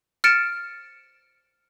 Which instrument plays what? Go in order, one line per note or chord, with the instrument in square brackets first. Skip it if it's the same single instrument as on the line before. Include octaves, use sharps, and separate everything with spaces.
[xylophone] F6 A6 C#7 D7 E7